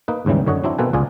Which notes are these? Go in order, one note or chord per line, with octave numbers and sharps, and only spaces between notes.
A#3 D#4 B4
D#2 G#2 C#3 E3 G3
F#2 D3 C#5 D#5 F#5
F#3 C4 D4 E4
B2 A#3 C4 A4 B4 G#5
C#2 F4 G#4 D5 G#5